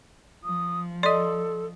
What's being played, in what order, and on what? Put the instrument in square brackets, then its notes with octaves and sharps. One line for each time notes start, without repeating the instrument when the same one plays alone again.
[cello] F3 [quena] D#6
[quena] A4 [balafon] D5 D#5 [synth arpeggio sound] C6 D#6